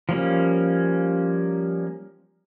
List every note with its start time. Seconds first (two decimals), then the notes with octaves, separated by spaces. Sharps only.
0.09 F3 G3 A#3 C#4